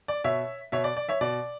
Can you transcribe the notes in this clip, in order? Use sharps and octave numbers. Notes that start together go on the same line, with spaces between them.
D5
B2 C#5 E5
B2 C#5 E5
D5
D5
C#5 E5
B2 D5